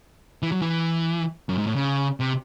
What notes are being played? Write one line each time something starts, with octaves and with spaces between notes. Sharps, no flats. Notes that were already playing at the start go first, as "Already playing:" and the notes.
E3
F#3
E3
F#2
G#2
A2
C#3
C3